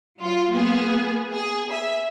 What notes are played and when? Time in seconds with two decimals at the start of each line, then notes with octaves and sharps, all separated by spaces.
0.19 F#3 F4
0.52 A#3 B3 G#4
1.33 G#4
1.71 E5